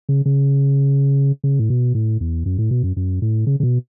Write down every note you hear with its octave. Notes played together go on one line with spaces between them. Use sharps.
C#3
C#3
C#3
A2
B2
A2
E2
F#2
A2
B2
F#2
F#2
A2
C#3
C#3
B2